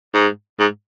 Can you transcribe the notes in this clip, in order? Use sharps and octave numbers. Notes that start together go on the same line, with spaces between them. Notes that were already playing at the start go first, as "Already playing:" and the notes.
G#2
G#2